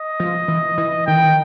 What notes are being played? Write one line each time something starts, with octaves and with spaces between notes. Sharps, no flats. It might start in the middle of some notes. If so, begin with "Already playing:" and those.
Already playing: D#5
F3
E3
E3
D#3 G5
E3
D#3